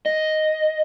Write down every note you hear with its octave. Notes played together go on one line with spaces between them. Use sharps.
D#5